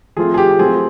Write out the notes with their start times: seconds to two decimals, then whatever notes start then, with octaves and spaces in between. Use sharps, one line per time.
0.17 F3 A3 C4 F4 G#4
0.34 G#4
0.38 G4
0.59 F#3 A3 C4 F4 G#4